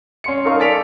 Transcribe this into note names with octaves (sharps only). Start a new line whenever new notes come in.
C#4 C6 C#7
D#4 A4 A#4 F5 C#6
A4 D5 G#5 B6 D7 F7